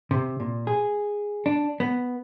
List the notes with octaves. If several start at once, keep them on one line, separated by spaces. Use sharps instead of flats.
C3
A#2
G#4
D4
B3